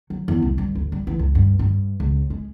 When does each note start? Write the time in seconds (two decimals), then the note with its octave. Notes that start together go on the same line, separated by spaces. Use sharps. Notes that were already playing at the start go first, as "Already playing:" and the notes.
0.10 F#3
0.28 E2
0.42 C2
0.58 G2
0.75 D2
0.92 G3
1.07 E3
1.19 C#2
1.35 G2
1.59 G2
2.00 C#2
2.30 G#3